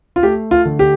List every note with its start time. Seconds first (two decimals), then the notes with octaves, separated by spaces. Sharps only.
0.16 F4
0.23 A3 G4
0.51 F4
0.65 D3
0.79 G4